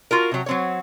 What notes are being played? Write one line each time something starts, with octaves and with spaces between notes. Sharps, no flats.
F4 F#4 A#4
C3 F#3
F#3 C4 C#5